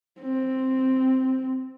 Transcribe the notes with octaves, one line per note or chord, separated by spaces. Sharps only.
C4